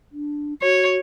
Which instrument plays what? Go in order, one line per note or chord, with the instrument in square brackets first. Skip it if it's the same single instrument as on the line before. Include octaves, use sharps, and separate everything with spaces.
[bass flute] D4
[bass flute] F#4 [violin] C#5